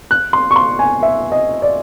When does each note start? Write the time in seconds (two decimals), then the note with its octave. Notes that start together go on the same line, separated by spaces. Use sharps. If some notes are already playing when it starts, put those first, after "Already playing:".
0.11 F#6
0.33 C6
0.51 C#6
0.56 C6
0.79 G#5
1.03 E5
1.32 D#5
1.62 D5